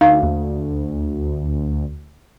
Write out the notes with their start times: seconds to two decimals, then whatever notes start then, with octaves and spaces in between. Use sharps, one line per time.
0.01 D2 D#4 F5
0.23 D#2